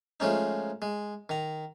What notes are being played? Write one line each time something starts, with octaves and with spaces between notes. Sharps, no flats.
F3 G#3 A3 C#4 D#4
G#3
D#3 A#5